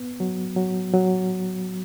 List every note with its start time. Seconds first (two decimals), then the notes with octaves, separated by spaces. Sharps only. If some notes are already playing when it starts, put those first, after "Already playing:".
Already playing: B3
0.20 F#3
0.56 F#3
0.94 F#3